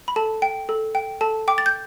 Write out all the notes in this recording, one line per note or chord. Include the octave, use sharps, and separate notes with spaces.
B5
A4 A5
G5
A4
G5
A4 A5
G5 D6
A6
G6